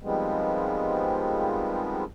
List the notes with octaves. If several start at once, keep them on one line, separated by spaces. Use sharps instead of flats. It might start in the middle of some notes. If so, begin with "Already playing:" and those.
D#3 F3 G3 G#3 B3 C4